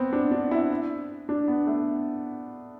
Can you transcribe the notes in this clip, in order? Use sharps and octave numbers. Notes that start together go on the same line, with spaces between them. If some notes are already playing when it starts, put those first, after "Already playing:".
Already playing: B3 C4
D4
D4
E4
D4
B3
A3